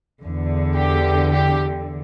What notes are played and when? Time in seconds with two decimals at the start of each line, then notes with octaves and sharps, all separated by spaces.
0.21 E2 D3
0.77 G4
1.33 G4